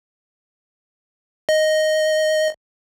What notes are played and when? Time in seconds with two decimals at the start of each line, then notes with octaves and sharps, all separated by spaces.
1.49 D#5